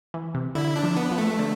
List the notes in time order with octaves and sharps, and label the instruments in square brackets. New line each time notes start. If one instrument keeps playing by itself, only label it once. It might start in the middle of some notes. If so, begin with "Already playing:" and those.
[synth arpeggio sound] E3
C3
[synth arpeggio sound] D3 [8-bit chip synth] E4
[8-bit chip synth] D4
[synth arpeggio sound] F3
[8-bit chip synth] B3
[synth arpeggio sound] F3
[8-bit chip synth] A3
[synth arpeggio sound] D3